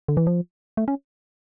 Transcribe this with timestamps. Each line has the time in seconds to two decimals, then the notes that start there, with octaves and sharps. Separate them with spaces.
0.08 D3
0.17 E3
0.27 F3
0.77 A3
0.88 C#4